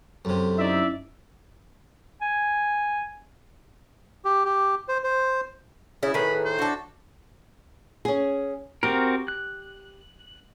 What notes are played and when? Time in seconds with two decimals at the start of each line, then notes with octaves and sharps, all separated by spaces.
0.25 F#2 C3 A4
0.58 C#4 D#4 E4 D5 E5
2.21 G#5
4.25 G4
4.45 G4
4.89 C5
5.04 C5
6.03 C#3 E4 G#4
6.14 A2 D#3 G#4 B4 B5
6.45 C5
6.59 D4 F#4 A4
8.05 C#4 G#4
8.83 C4 F#4 G4 A#4
9.28 F#6